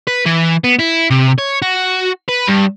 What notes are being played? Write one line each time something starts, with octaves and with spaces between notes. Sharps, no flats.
B4
E3
B3
E4
C3
C#5
F#4
B4
G2